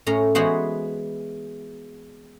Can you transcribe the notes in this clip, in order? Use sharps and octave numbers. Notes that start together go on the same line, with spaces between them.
A2 C#4 A#5
E3 G#3 B3 F#4 G#4 C5